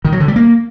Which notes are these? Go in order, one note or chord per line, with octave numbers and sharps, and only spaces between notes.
D#3
F#3
D3
G3
A#3